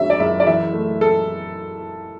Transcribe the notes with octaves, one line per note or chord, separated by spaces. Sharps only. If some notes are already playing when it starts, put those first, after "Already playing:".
Already playing: F#2 D3 F#3 E5
D5
F#1 E5
D5
E3 E5
A3
A4